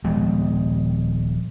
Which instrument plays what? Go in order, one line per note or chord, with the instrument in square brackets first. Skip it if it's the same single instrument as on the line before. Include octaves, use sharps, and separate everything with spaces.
[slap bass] D#1 F3 G#3 B3